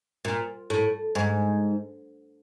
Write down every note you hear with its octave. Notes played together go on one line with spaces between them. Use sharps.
A#2
A2
G#2